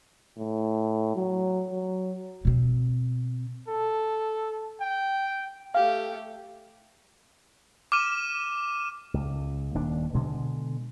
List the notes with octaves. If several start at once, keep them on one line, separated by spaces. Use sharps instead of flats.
A2
F#3
F#3
B2 C4
A4
G5
A3 G4 F5
D6 F6 D#7 E7
C#2
D#1 D#2 D4
B2 D3 G#3